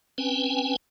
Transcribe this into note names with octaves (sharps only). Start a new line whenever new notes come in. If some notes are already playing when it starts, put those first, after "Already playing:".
C4 C#4 B4 G5 G#5